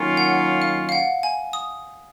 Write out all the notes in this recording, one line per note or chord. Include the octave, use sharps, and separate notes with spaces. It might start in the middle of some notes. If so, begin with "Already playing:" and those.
Already playing: D#3 F#3 A#3 C#4 F4
F#5
F5
F5
F#5
G#5
D#6